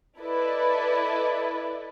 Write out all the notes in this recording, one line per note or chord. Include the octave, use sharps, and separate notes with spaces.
E4 A4 B4 D5 D#5